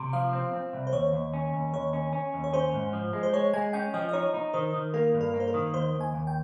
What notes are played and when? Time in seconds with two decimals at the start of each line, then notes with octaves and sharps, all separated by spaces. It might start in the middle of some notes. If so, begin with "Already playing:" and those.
Already playing: C3
0.13 F3 F5
0.33 C4
0.53 C4
0.73 C2
0.87 C5
0.93 D#2 C#5
1.13 D#2
1.34 C#4
1.54 D#2
1.74 D#2 C#5
1.93 C#4
2.13 C#4
2.34 D#2
2.44 C#5
2.53 C#4 C5
2.74 G#2
2.93 F3
3.13 G#3
3.23 C5
3.33 G#3 C#5
3.53 G#3 G#5
3.73 C#4 G5
3.94 F3 D#5
4.09 D#5
4.13 D#4 C#5
4.34 D#4
4.53 D#3 C5
4.74 D#3
4.94 A#3 A#4
5.14 G2
5.21 A#4
5.34 A#3
5.40 C5
5.48 A#4
5.54 D#3
5.74 D#2 C5
5.93 D#2
6.01 G#5
6.14 D#2
6.27 G5